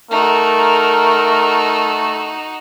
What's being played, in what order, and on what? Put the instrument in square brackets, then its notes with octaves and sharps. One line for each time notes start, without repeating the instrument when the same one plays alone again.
[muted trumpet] A3 [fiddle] D#4 F#4 [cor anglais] A#4